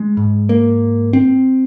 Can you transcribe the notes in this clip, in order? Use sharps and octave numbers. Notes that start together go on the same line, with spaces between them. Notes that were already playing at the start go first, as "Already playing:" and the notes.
Already playing: G#3
G#2
A#3
C4